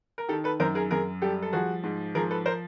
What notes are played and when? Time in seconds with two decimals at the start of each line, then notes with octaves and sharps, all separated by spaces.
0.18 A#4
0.29 D#3 G4 A4
0.44 A4 B4
0.60 F#2 A#4 C5
0.75 G#4 A#4
0.91 F#2 G#4 A#4
1.22 G3 G4 A4
1.42 A4
1.53 F3 F#4 G#4
1.84 G#2
2.15 F3 G#4 A#4
2.31 A4 B4
2.46 A#4 C5